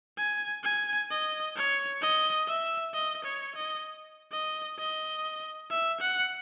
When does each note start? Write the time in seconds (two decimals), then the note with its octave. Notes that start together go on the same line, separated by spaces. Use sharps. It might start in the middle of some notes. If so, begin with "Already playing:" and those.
0.18 G#5
0.64 G#5
1.11 D#5
1.56 C#5
2.01 D#5
2.48 E5
2.94 D#5
3.25 C#5
3.56 D#5
4.32 D#5
4.78 D#5
5.70 E5
6.01 F#5